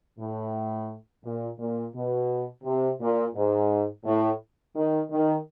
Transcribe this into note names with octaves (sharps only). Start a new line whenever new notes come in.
A2
A#2
A#2
B2
C3
A#2
G#2
A2
D#3
D#3